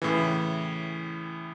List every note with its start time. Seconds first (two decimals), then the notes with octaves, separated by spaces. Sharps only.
0.02 A2 C#3 E3